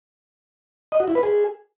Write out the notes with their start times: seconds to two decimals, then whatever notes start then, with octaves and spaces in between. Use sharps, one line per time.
0.92 D#5
1.00 F#4
1.08 E4
1.15 B4
1.23 G#4